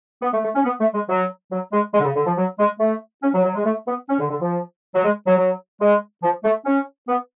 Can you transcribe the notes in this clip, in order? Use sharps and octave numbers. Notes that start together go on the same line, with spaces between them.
B3
A3
A3
C#4
B3
A3
G#3
F#3
F#3
G#3
G#3
D3
C#3
D3
F3
F#3
G#3
A3
C#4
F#3
F#3
G#3
A3
B3
C#4
D3
D3
F3
F#3
G#3
F#3
F#3
G#3
F3
A3
C#4
B3